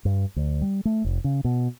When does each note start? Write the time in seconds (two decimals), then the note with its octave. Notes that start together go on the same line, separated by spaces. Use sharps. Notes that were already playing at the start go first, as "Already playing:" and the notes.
0.05 G2
0.36 D2
0.62 G3
0.85 A3
1.04 F1
1.24 C#3
1.45 B2